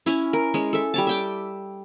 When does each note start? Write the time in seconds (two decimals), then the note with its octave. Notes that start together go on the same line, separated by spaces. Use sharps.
0.06 C#4 E4
0.33 A#4
0.54 G#3 C#4
0.73 A4 E5
0.94 G3 C#5 A5
1.07 E5 G5 D6